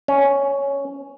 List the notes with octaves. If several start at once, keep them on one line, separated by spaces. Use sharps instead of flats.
C#4